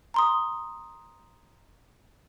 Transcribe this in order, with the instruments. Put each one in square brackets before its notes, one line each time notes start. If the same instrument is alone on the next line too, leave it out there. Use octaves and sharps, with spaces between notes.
[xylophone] A#5 C6 D#6